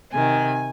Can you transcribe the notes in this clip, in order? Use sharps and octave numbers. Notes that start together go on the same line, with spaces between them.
C3 D#3 G#5